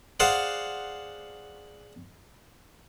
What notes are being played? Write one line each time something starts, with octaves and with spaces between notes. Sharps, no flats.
G#4 C5 D5 F5 F#5